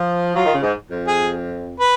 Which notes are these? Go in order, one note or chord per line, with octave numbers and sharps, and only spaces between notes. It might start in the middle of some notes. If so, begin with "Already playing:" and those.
Already playing: F3
F#3 F4
D#3
C#3
G#2
F2
G#4
B4